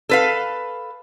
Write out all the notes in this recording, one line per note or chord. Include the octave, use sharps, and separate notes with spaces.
A4 B4 F5